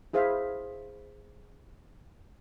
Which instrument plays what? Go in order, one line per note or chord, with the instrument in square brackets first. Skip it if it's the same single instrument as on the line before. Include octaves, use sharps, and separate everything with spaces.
[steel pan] E4 G#4 C5 E5 F5